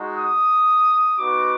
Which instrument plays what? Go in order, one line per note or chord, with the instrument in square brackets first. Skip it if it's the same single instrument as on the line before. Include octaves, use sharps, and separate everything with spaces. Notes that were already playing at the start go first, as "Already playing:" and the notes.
Already playing: [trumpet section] G#3 D#4 F#4
D#6
B3 D#4 F#4 D6